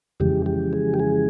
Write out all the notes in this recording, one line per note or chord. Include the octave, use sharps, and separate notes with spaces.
F2 C#3 E3 G#3 G4
G4
G#4
G4
G#4